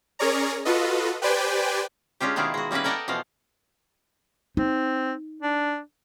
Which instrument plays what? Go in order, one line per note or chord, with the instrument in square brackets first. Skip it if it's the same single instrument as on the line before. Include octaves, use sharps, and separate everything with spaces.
[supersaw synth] C#4 G#4 A#4 C#5 D5 A#5
F4 F#4 A4 B4 D#5
G4 B4 C5 D5 G5 G#5
[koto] G#3 C#4 D4 F4 G4
B2 D#3 E4 F4 G#4 D5
G#3 F#4
G3 A#3 C#4 E4 B4
A4 A#4 D5 D#5 F#5 G5
B2 E3 F3 F5
[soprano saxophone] C4 [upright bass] D#4
[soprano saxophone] D4